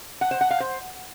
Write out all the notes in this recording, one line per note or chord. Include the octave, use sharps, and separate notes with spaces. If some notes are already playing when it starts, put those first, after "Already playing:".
F#5
C5
F#5
F5
C5